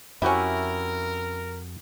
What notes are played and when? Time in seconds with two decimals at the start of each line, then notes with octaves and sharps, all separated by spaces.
0.22 F2 C#4 E4 F#4 G4 A#4 E5